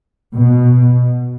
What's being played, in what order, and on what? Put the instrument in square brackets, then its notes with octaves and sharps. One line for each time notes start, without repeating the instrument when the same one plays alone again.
[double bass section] B2